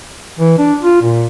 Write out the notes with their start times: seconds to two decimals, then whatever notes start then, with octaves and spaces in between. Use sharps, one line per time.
0.39 E3
0.58 D4
0.83 F4
1.01 A#2